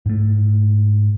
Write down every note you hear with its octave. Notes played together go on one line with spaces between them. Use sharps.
G#2 A3